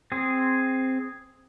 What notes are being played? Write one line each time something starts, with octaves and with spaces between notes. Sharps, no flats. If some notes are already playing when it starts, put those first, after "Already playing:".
C4 G#4